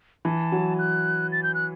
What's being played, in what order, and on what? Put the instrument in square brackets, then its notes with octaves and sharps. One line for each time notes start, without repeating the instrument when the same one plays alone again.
[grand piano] E3 [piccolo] A5
[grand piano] F#3
[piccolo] F#6
A6
G6
F#6